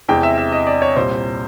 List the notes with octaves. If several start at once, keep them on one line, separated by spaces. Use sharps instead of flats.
E2 C3 E3 G#3 C4 G5
E5
E5
D#5
D5
C#5
C2 A#2 G3 C5